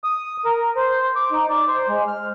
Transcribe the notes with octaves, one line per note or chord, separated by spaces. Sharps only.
D#6
A#4
C5
D6
D#4
D5
C5
G#3
F6